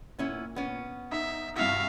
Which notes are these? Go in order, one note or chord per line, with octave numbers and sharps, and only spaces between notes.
A#2 B3 C#4 E4
B3 C#4
D#4 E5
G2 C3 E4 F#4 E5 F5